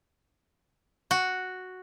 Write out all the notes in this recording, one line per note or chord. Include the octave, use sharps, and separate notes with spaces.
F#4